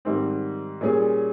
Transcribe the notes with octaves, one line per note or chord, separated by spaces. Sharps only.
G#2 D#3 G3 C4
A#2 G3 C#4 G#4